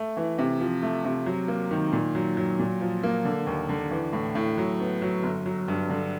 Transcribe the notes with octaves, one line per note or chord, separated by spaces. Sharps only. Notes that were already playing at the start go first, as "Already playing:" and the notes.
Already playing: A3
E3
C3
F3
A3
C3
F#3
A#3
D#3
A#2
F#3
F#3
A#2
F3
A#3
D3
D#2
D3
E3
A2
A2
F#3
B3
F#3
G1
F#3
G2
D3